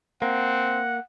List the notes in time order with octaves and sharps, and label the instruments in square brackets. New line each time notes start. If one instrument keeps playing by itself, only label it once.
[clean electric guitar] A#3 [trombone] C4 [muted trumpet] F#5